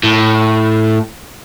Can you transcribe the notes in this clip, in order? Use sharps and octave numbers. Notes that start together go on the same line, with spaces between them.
A2